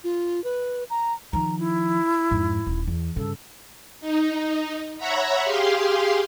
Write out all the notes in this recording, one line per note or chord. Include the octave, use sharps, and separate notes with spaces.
F4
B4
A#5
D#3 F3 A#5
E4
F2 G#2
D#1
E2
G2 C#3 A4
D#4
C#5 E5 F#5 A#5 B5
G4 G#4 F5 C6